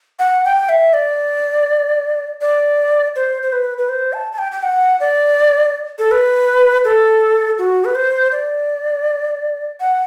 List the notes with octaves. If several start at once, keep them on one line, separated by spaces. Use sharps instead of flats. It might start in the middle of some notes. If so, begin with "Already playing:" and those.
F#5
G5
E5
D5
D5
C5
C5
B4
B4
C5
A5
A5
G5
G5
F#5
D5
A4
B4
A4
F#4
B4
C5
D5
F#5